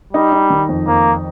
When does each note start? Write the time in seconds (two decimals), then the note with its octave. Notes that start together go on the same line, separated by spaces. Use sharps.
0.13 G3 D#4
0.32 D#4
0.50 D#3
0.69 F2
0.87 F2 A#3